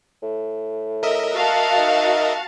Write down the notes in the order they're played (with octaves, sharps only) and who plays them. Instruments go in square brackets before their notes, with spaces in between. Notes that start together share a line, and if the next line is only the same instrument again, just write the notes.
[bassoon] A2
[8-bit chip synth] A#4 D#5 E5
[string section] F#4 F5 A5
[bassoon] D#4